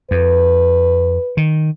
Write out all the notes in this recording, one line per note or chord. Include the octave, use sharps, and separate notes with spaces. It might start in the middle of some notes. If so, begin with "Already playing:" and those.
F2 B4
D#3